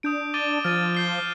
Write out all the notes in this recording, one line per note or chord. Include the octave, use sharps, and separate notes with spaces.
D4 D#6 G6 D7
D6 A6 D#7 G7
F3 F6 A6 D#7
G6 C7 G7